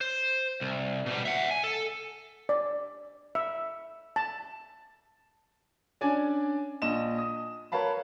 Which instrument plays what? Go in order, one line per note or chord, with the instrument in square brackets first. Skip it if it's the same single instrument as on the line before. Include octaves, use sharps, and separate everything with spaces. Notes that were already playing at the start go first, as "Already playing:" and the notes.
[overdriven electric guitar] C5
C2
B2 G3
E5 F#5
G#5
A4
[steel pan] D5
E5
A5
[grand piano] C#4 D4 D5 G#5
A#1 D#5 E7
D#6
A#4 B4 C#5 F5 A5 B5